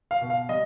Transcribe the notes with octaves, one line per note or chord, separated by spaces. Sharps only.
F5
B2
F5
G3 D#5